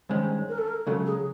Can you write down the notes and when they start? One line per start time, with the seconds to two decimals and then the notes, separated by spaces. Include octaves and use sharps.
0.10 G2 D#3 G#3 C#4 C5
0.49 A#4
0.58 A4
0.67 A#4
0.87 C#2 C#3 F#3 A4
1.06 G#4